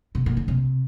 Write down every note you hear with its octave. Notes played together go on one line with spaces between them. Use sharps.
C3
A#2
C#3
C3